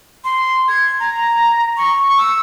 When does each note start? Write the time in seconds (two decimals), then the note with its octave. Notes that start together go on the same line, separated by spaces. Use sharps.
0.24 C6
0.68 G#6
1.00 A#5
1.77 C#6
2.18 E6